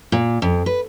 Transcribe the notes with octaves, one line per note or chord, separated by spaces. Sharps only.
A#2
F2
B4